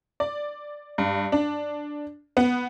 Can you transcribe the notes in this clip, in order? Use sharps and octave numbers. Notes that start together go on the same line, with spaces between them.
D5
G2
D4
B3